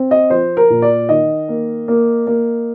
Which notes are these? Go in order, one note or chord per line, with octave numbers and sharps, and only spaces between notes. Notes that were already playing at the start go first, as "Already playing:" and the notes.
Already playing: C4
D#5
F3 C5
A#4
A#2
D5
D#3 D#5
A#3
A#3
A#3